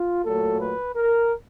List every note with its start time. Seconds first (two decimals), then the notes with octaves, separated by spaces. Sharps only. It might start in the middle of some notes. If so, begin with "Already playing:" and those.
Already playing: F4
0.24 A#2 F#3 A3 A4
0.61 B4
0.96 A#4